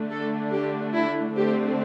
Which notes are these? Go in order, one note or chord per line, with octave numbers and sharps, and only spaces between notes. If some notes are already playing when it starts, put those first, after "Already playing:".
Already playing: D3 A3 D4
A4
G4
E4
D3 A3 C4 G4